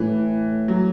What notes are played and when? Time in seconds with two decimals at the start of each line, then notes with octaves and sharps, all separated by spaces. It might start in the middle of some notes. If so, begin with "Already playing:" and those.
Already playing: A2 E3
0.68 F#3